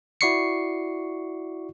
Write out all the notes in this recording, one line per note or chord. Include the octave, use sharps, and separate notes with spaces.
E4 F#4 D5 C#6 C7 C#7